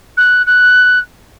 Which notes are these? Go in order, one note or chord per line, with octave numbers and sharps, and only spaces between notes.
F#6
F#6